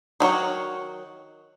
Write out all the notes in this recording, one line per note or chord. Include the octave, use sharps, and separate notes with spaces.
D#3 F#3 F#4 C#5